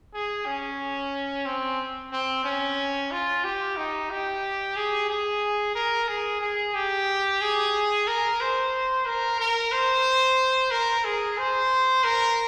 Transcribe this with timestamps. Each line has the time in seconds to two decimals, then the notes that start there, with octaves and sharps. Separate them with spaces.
0.14 G#4
0.46 C#4
1.46 C4
2.12 C4
2.44 C#4
3.11 F4
3.44 G4
3.76 D#4
4.10 G4
4.76 G#4
5.10 G#4
5.75 A#4
6.08 G#4
6.41 G#4
6.74 G4
7.41 G#4
8.07 A#4
8.41 C5
9.06 A#4
9.40 A#4
9.72 C5
10.71 A#4
11.05 G#4
11.38 C5
12.04 A#4